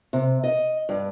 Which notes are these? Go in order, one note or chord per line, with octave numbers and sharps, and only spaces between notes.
C3
D#5
G2